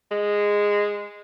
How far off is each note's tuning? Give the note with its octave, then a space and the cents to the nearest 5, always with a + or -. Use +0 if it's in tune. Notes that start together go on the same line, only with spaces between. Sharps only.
G#3 -10